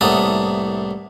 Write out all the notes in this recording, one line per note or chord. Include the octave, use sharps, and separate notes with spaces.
C2 A2 A#3 B3 A4 D#6